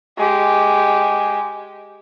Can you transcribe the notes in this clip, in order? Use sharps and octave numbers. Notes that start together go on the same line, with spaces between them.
G#3 G4